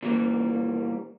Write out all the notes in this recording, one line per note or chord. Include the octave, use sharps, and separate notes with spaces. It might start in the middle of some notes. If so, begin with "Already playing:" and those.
A#2 E3 G3 A#3